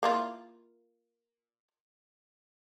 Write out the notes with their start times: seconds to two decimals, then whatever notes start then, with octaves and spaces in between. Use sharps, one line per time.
0.03 A#3 E4 F4